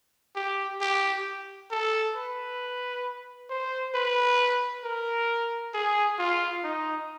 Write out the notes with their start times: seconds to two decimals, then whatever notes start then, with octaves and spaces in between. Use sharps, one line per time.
0.36 G4
0.81 G4
1.71 A4
2.16 B4
3.50 C5
3.95 B4
4.84 A#4
5.74 G#4
6.19 F4
6.64 D#4